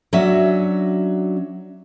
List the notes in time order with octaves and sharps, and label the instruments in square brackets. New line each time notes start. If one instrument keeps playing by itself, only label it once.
[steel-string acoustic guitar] F#3 C#4 D4 F#4 E5